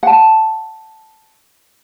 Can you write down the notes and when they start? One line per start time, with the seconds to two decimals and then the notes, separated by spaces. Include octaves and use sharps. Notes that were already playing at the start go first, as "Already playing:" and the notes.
0.03 F#5 A5